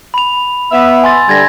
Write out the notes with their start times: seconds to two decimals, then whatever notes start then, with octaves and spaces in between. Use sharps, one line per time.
0.14 B5 F7
0.72 B3 E5
1.04 G#5 C6 A6
1.29 D3 G3 G#6 A#6